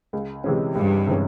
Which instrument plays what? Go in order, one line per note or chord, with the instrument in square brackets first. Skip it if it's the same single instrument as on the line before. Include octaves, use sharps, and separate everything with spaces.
[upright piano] C#2
C3 E3 G#3 C#4
[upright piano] C#2 [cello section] G2
[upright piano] C3 E3 G#3 C#4